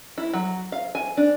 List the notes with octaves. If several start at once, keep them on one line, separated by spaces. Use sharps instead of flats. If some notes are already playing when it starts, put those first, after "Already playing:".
E4
F#3
F5
G#5
D4